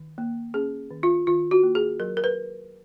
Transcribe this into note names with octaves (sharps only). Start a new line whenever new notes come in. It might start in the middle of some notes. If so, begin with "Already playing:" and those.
Already playing: D#3
A#3
C#4 G#4
D#3
F4
D#3 F4
F#4
A#3
G#4
F#3 A#4
A#4
B4